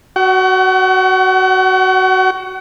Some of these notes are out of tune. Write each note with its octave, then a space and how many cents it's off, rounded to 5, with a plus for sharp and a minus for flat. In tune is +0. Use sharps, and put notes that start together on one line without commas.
F#4 +10 F#5 +40